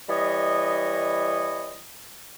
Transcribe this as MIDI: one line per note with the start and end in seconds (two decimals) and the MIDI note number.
0.09 1.79 52
0.09 1.79 55
0.09 1.79 73
0.09 1.79 75